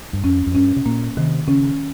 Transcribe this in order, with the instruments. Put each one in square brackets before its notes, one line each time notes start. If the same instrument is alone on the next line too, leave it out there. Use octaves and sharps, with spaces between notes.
[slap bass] G2
[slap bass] F2 [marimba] C#4
[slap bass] F2
[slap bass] G2 [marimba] C#4
[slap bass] C3
[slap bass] A#2 [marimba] A#3
[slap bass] C3 [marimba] D#3
[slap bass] C#3 [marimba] C#4